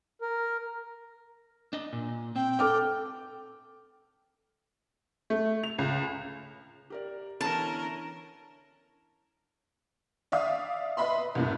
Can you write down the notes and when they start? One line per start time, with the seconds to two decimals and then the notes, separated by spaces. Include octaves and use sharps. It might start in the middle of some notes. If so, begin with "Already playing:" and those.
0.22 A#4
1.73 D4 D#5
1.93 A#2
2.36 C4 G5
2.59 A4 D6 F6
5.30 A3
5.63 F7
5.78 C#2
6.90 G4 A#4 D5
7.41 D3 E3 B3 C#4 A#4 A5
10.32 D5 E5 F5 D#6
10.97 B4 D#5 E5 B5 C6
11.35 C2 F#2 A2